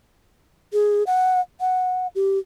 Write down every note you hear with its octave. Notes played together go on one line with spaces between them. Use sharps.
G#4
F#5
F#5
G4